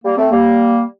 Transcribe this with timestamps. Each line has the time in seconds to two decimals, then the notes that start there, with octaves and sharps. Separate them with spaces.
0.05 G3 A#3
0.18 A3 C4
0.31 G3 A#3